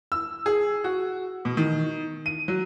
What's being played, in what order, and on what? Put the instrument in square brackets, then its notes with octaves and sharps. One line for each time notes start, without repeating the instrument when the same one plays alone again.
[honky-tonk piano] E6
G#4
F#4
B2
D#3
D#7
F#3